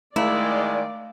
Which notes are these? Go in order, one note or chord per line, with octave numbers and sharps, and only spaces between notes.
D#3 G#3 A3 E4 D5 F5